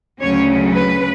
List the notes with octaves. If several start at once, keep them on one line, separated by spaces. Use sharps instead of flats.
D2 C#3 F#3 C#4 C#5
B4